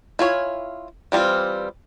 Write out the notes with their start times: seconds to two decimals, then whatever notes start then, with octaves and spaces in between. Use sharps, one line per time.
0.19 E4 F4 C#5 G#5
1.12 E3 G3 C4 F4